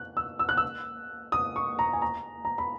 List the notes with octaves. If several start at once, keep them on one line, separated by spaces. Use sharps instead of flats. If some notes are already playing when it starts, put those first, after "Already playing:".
Already playing: F#6
E6
E6
F#6
E6
D#6
C#6
A#5
G#5
A#5
A#5
B5